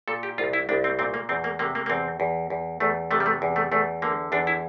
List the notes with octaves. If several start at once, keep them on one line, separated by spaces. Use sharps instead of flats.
A#2 A4
G4
C2 F4
E4
C2 D4
C4
A#2 C4
A#3
E2 C4
A#3
C3 A#3
A#3
A#3
E2 C4
E2
E2
E2 A3
C3 A3
G3
A3
E2
A3
E2 A3
D3 A#3
E2 D4
E4